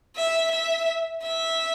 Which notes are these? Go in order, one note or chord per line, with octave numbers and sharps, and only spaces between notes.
E5
E5
E5